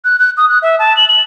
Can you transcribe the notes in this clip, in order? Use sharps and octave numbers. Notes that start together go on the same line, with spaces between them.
F#6
F#6
D#6
F#6
E5
A5
F#7
F#7